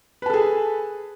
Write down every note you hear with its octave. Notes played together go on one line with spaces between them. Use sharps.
G#4 A4 B4 A5